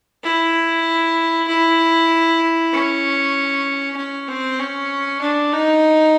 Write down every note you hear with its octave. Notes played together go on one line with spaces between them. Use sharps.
E4
E4
C#4
C#4
C4
C#4
D4
D#4